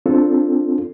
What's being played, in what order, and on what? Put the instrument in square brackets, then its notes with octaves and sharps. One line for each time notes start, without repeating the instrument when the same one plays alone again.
[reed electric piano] C4 D4 F4 A4